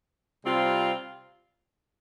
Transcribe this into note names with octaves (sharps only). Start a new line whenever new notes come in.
C3 G3 C4 F4